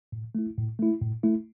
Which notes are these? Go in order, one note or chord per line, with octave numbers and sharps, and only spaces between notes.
A2
A3 E4
A2
A3 E4
A2
A3 E4